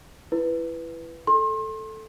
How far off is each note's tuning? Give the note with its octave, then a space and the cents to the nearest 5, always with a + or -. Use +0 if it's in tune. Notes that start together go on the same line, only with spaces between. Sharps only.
E4 +25 B4 +0
A4 +0 C6 +35